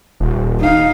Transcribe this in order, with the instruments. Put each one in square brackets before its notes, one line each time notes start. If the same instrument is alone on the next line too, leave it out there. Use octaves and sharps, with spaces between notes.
[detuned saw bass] D#1
[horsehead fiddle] D#4 F5